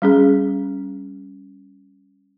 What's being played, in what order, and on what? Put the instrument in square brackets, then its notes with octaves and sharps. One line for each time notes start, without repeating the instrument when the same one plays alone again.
[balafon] G3 C#4 G#4